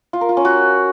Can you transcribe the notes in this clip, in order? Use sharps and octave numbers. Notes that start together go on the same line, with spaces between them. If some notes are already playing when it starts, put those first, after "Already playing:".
F4
A#4
F4
C#4
F#4